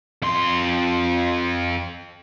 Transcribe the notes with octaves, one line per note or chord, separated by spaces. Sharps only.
F2 C6